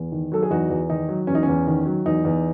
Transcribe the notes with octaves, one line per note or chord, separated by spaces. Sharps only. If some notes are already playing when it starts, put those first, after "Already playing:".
Already playing: E2
D#3
F#3 A4
G#4
E2 D#4 F#4
E2
D#3 D#4
F#3
E2 C#4
D#4
E2 C#4
D#3
F#3
E2 D#4
E2